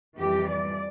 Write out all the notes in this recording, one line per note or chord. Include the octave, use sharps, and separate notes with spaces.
F2 E3 G3 G4
D5